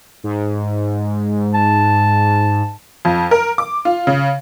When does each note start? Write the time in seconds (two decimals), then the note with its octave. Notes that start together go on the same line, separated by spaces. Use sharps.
0.24 G#2
1.54 A5
3.05 F2
3.31 A#4
3.58 D6
3.85 F4
4.07 C#3